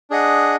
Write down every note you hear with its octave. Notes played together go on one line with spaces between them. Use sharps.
D4 G#4 D#5 F#5